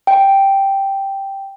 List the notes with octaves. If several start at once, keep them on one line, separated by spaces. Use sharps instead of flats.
G5